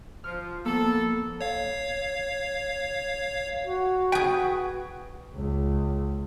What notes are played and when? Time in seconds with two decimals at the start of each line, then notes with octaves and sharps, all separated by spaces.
0.24 F3 F6
0.65 F3 A#3 B3 A4
1.41 C#5 F5
3.65 F#4
4.12 G#4 B4 G5
5.35 C#2